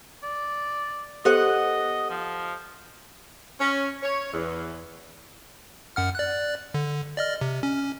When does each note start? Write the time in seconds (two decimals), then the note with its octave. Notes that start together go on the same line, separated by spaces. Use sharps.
0.23 D5
1.25 B3 G4 A4 C5 D#5 F#5
2.10 F3
3.60 C#4
4.02 C#5
4.33 E2
5.96 F#2 F#5 F6
6.15 D5 F#6
6.74 D3
7.17 D5 D#5 F6
7.41 C3
7.63 C#4